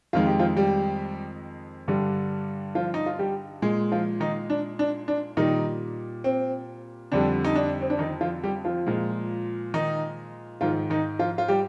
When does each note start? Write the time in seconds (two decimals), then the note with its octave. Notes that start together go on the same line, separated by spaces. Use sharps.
0.13 F2 D#3 G#3 F4
0.26 G4
0.39 F3 F4
0.56 G3 G4
1.88 G2 D3 G3
2.75 F3 F4
2.94 D#4
3.06 F4
3.19 G3 G4
3.62 A#2 G#3 G#4
3.92 F3 F4
4.20 D#3 D#4
4.50 D4
4.79 D4
5.08 D4
5.37 A#2 D#3 G3 D#4
6.24 C4
7.12 F2 D3 G3 D4
7.45 D#4
7.56 D4
7.81 C4
7.90 D4
7.99 D#3 D#4
8.21 F3 F4
8.44 G3 G4
8.65 F3 F4
8.86 A#2 F3 G#3
9.74 D#3 D#4
10.61 G#2 D#3 F3 G#3 F4
10.90 D#3 D#4
11.19 F3 F4
11.38 F4
11.48 G3 G4